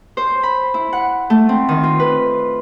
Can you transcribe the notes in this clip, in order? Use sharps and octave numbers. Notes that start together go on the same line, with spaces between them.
C5
B5
E4
F#5
A3
C4
D#3
F4
B4